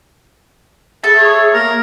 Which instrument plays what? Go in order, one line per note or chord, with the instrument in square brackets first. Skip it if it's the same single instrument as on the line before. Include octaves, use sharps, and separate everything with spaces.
[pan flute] G#4 [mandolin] A4 E5 A5
[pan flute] G#4 [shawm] C#5
[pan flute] G#4
[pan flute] A#3 [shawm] A#4